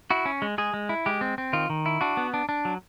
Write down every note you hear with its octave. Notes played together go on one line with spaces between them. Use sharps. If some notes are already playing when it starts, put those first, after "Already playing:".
E4 F#4
C#4
G#3
G#3 G#4
G#3
E4
G#3 G4
C4
C4
D#3 F4
D#3
E4
D4 F#4
B3
D4
D4
F#3